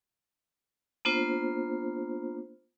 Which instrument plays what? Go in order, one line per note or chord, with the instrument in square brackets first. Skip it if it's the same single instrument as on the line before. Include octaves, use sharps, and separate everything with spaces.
[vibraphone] A#3 B3 D4 F4 C5